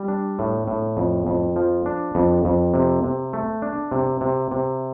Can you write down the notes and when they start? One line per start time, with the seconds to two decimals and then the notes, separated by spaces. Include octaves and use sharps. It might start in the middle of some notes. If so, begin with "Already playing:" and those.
Already playing: G3
0.08 D4
0.39 A2
0.68 A2
0.97 F2
1.27 F2
1.56 F3
1.86 D4
2.15 F2
2.45 F2
2.74 C3
3.04 C3
3.33 A3
3.62 D4
3.91 C3
4.21 C3
4.51 C3